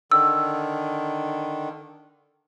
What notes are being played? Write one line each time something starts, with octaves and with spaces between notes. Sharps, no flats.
D3 D#3 E6